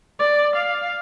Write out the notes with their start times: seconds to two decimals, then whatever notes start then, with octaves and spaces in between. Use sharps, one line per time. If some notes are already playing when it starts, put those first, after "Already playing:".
0.19 D5
0.57 F5